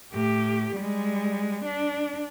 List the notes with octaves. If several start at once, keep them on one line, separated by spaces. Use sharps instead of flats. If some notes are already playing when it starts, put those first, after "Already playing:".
A2 G4
G3 G#3
D4